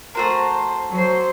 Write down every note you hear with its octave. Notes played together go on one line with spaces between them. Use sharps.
A3 F#4 A#4 C5
F#3 C5